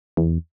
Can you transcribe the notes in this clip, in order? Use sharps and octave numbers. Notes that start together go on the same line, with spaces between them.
E2